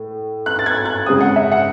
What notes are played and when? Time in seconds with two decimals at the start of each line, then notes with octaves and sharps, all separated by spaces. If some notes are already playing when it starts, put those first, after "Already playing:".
Already playing: A2
0.46 F#6
0.59 A6
0.66 G#6
0.86 F#6
1.06 C#3 G#3 C4 D#6
1.21 F#5
1.36 E5
1.52 F#5